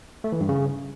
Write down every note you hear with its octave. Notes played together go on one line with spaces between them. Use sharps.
A3
E3
G2
C#3